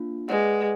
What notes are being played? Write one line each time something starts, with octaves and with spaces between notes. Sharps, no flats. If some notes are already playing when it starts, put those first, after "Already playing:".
Already playing: A#3 D4 F4
G#3 G#4 B4 D5 F#5